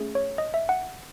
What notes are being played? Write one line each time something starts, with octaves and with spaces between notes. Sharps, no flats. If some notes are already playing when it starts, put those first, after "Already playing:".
Already playing: A3 C#4 G#4
C#5
D#5
E5
F#5